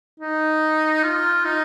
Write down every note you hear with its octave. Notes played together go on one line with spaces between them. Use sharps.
D#4
F4
D#4